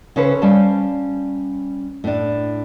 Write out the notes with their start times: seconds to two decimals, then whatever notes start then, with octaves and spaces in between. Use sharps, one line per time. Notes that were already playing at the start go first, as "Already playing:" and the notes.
0.16 C#3 C#4 A4 B4 C5
0.42 G3 C#4 C5 F5 A5
2.04 A2 D4